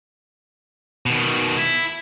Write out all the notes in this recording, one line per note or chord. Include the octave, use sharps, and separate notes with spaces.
B2 D#3
E4